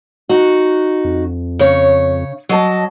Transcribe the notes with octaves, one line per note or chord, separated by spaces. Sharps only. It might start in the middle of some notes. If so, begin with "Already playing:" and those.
D#4 F#4
F2
C#3 C#5
F#3 D#5 A5